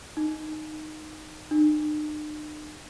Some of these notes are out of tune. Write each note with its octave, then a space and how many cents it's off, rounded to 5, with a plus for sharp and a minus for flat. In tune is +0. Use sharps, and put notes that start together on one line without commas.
D#4 -10
D#4 -45